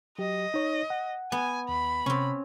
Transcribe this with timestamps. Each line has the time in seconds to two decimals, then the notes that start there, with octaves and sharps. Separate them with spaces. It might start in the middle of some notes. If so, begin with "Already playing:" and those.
0.18 F#3 G4 D#5
0.54 D#4 C#5
0.90 F#5
1.32 B3 G#5
1.69 D#2 B5
2.06 C3 C4 C#4